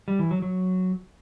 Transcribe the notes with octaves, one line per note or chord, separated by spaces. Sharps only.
G3
E3
F#3
F#3